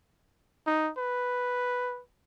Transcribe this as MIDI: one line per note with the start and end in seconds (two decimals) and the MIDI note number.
0.67 0.91 63
0.98 2.01 71